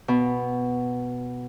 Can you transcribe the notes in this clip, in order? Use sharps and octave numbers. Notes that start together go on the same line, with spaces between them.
B2